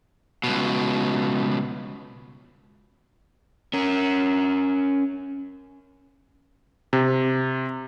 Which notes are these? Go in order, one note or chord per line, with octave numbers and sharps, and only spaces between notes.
C#2 B2
C#4 A#4
C3